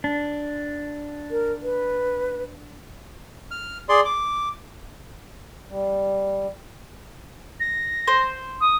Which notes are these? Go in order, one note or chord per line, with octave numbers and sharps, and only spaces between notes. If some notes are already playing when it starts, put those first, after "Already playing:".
D4
A#4
B4
F6
G#4 D5 C6
D6
G3
A#6
C5
D#6